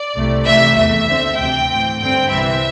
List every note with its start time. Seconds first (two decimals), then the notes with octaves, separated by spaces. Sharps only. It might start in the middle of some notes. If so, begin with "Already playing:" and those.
Already playing: D5
0.15 C2 C3 A3
0.46 C2 C3 E3 A3 E5
0.76 E2 E3 A3 E5
1.07 D2 D3 C4
1.38 D2 C3 E3 C4 G5
1.69 A2 E3 C4
2.00 G2 D3 G3 C4 G5
2.30 C2 C3 E3 C4 E5